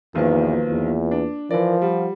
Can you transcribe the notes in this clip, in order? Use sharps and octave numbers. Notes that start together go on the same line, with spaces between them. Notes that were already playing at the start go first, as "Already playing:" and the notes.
B1 E2 D#3 F3 A#3 F4 B4
E2
D4
E3 F3 A#4 D5
G3 F4 F#5